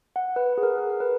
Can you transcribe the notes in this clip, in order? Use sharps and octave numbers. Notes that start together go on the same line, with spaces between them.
F#5
B4
G#4
A#4
A#4
A#4
B4